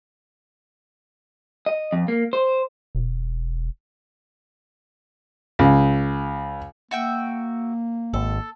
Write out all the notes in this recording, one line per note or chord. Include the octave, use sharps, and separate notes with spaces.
D#5
F2
A#3
C5
E1
C#2
A#3 F#4 E5 G5
G#1 A4